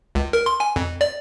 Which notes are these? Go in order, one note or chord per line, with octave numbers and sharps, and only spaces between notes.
C#2
A#4
C6
G#5
F2
D5